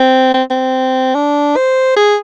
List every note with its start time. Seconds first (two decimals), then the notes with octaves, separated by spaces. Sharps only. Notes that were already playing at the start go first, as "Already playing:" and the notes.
Already playing: C4
0.34 C4
0.50 C4
1.15 D4
1.56 C5
1.96 G#4